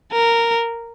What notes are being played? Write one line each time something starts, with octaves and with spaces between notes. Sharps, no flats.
A#4